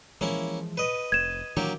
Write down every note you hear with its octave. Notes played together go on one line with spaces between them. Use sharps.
E3 F3 G#3 A#3 C#4 E4
B4 D#5
F1 G#6 E7
D#3 E3 F#3 A#3 D4 G4